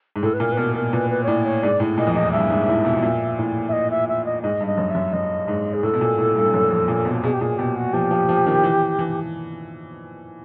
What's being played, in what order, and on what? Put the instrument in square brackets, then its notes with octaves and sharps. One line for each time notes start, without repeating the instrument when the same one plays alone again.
[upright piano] G#2
[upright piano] A2 [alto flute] A4
[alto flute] B4
[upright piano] A#2 [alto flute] A#4
[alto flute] B4
[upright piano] B2 [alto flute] A#4
[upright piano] B2 [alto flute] A#4
[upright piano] A#2 [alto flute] B4
[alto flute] B4
C#5
[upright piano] A2 [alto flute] D5
[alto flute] C#5
[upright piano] G#2 [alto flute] D5
[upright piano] A2
[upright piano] A#2 [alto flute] D#5
[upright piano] F2
[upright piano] E2 [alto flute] D#5
[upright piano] G2 [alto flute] E5
[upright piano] G#2
A2
B2
B2
A#2
A2
[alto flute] E5
D#5
E5
E5
D#5
[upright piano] G#2 [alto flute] D#5
[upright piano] G2
[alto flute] D#5
[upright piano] F#2
[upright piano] F#2 [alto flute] E5
[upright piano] F#2 [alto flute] D#5
[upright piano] G#2
[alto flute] G#4
[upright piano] A2 [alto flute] A4
[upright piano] B2
A#2
A2
G2
F#2
F2
A#2
B2
[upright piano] B2 [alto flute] G#4
[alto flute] G4
[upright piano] A#2 [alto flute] G#4
[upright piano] B2 [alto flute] G4
[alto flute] F#4
[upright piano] F3 [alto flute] G4
[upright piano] F3
F3
D#3
E3
E3